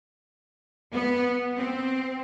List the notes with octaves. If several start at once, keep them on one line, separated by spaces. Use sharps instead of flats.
B3
C4